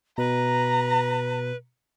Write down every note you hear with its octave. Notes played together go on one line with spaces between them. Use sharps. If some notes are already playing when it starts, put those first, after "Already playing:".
B2 B4 A#5